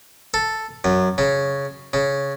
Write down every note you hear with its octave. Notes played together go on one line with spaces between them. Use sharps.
A4
F#2
C#3
C#3